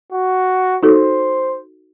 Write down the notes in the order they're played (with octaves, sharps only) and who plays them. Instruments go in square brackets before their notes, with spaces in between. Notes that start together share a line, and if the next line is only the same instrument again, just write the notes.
[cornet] F#4
[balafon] D#4 F#4 A4 [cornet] C5